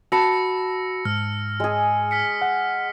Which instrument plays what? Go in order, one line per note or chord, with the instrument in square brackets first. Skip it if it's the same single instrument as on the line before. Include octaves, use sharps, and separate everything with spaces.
[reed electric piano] F#4 B5 [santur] A5 [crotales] E6 A#6 C#7
[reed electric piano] G#2 [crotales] F6
[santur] G#3 G#4
[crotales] F6 B6 C#7
[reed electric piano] F#5